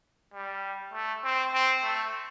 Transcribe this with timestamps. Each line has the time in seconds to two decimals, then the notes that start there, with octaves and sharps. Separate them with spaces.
0.34 G3
0.93 A3
1.24 C4
1.53 C4
1.83 A3